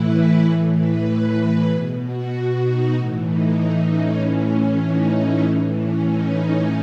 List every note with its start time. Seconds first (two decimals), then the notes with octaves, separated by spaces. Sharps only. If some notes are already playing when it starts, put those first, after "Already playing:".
Already playing: A2 E3 E4 B4
0.44 A2 E3 C#5
0.75 B4
1.06 B4
1.69 B2 G#4
2.00 F#4
2.63 D#4
2.94 A2 E3
3.26 D#4
3.88 C#4
4.19 A2 E3 C#4
4.81 D#4
5.13 D#4
5.43 A2 E3
5.75 C#4
6.07 D#4